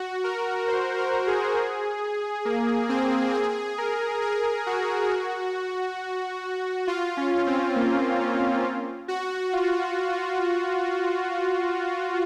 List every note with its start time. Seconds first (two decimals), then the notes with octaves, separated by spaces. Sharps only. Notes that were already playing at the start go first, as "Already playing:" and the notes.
Already playing: F#4
0.24 A#4
0.68 C5
0.98 A#4
1.27 G#4
2.45 A#3
2.89 C4
3.33 G#4
3.78 A#4
4.22 G#4
4.66 F#4
6.87 F4
7.17 C#4
7.47 C4
7.76 A#3
8.20 C#4
9.08 F#4
9.53 F4
10.12 F4